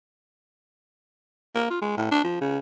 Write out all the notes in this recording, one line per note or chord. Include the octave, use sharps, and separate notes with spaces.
A#3
F4
G#3
A2
D4
F3
C#3